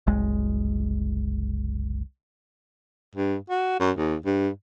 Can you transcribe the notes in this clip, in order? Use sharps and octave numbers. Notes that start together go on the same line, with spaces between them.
F#1 C2 G#3
G2
F#4
F#2
D#2
G2